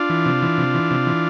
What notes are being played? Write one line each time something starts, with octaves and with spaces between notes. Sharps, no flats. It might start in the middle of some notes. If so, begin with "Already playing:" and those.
Already playing: D4 F4
E3
C3
E3
C3
E3
C3
E3